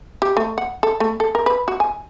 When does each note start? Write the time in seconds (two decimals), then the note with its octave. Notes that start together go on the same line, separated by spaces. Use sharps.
0.22 G4
0.37 A3
0.58 F#5
0.83 A4
1.00 A3
1.20 A4
1.35 A#4
1.46 B4
1.68 F#4
1.80 G#5